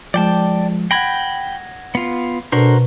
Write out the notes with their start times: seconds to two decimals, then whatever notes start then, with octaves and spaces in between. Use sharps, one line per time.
0.14 F3 G#3 D5 G5 A5
0.91 F#5 G5 B5 G#6 A#6
1.95 B3 F4
2.52 B2 D4 F#4 A4 A#4 C5